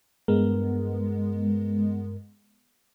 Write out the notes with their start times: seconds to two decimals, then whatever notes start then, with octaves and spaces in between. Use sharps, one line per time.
0.28 G2 G#3 B3 A#4